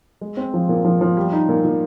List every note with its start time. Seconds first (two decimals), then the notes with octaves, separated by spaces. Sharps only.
0.21 G#3
0.37 C4
0.54 F3
0.69 A#2
0.85 F3
1.01 F3
1.17 G3
1.32 D#4
1.49 A#2
1.64 A#2